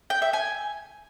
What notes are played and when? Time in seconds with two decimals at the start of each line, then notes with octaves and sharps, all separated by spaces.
0.10 G5
0.22 E5
0.33 G#5